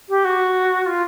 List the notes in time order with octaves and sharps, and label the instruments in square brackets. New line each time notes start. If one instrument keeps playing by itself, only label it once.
[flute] G4
F#4
F4